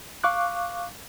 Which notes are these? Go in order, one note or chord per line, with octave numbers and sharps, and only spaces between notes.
F5 C#6 D6 F#6